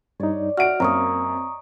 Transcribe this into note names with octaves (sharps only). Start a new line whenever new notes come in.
G2 D#4 C#5 D5
F#4 D#5 E5 F#5 F6 D7
F#2 A#3 C4 A#5 C#6 D#6